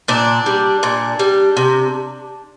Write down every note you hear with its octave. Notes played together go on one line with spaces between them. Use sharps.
A#2 D4
G3
A#2
G3
C3